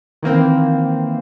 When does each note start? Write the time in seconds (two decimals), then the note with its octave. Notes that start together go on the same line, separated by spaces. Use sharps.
0.23 D#3 E3 A#3 C4